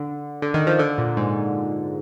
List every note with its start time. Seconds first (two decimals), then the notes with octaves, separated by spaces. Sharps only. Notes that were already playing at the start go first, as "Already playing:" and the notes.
Already playing: D3
0.42 D3
0.54 D#3
0.67 F3
0.79 D3
0.98 A#2
1.17 G#2